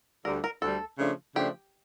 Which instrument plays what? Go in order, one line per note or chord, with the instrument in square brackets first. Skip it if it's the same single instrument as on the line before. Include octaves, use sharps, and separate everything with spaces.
[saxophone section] D2 D3 G3 [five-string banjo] A#4
[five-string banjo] A#4
[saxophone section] D2 D3 G3 [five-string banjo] A4
[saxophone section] C#3 F3 A3 D4
[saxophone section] C#3 F3 A3 D4 [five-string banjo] G4